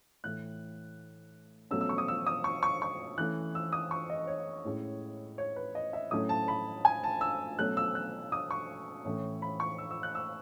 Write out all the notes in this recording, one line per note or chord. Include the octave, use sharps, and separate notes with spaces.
A2 E3 A3 F#6
B2 F#3 A3 C#4 E6
E6
C#6
D#6
E6
D#6
C#6
C#6
C#6
E3 A3 C#4 F#6
E6
D#6
C#6
D#5
C#5
A2 G#3 C#4
C#5
B4
D#5
E5
A2 F#3 A3 C#4 D#6
A5
B5
G#5
A5
E6
B2 F#3 A3 C#4 F#6
E6
F#6
D#6
C#6
A2 E3 A3 C#4
B5
C#6
E6
E6
F#6
E6